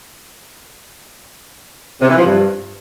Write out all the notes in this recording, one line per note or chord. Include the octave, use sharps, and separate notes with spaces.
C3
E3
F3
G2